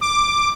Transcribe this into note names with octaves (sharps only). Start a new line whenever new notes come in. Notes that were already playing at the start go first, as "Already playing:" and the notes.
D6